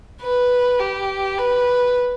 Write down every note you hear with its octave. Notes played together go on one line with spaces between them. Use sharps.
B4
G4
B4